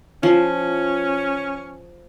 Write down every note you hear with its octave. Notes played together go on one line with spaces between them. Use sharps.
F3 C#4